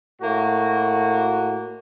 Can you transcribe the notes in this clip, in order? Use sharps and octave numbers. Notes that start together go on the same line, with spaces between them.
A2 A#3 F#4